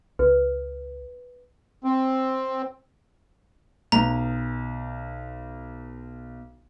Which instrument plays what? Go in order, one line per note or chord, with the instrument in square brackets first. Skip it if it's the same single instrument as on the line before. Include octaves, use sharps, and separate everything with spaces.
[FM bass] C#2 [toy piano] B4
[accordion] C4
[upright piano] B1 [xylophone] A#5